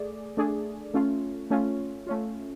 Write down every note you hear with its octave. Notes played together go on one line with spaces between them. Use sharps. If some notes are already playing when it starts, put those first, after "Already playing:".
Already playing: A3 G#4 D5
A3 D4 G#4 D5
A3 C#4 F4
A3 C#4 F4
A3 C#4 F4